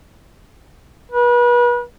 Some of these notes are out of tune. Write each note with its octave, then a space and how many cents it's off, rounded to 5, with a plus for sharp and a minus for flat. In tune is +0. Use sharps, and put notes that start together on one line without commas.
B4 -35